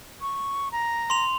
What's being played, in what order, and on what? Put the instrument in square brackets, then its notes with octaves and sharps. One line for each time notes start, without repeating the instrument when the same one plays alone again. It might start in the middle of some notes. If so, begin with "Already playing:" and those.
[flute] C#6
A#5
[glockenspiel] C6 F7